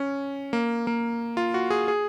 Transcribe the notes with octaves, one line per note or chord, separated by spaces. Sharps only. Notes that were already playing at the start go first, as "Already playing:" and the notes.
Already playing: C#4
A#3
A#3
F4
F#4
G#4
G#4